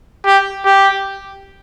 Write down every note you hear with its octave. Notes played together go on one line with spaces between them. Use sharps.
G4
G4